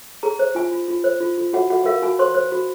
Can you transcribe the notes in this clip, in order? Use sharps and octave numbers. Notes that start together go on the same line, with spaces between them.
G#4 A#5
C5
F4 G#5
F4
F4
C5
F4
F4
F#4 F#5
F#4 F#5
F#5
A#4 F5
F#4 G#5
C5 C6
C5
F#4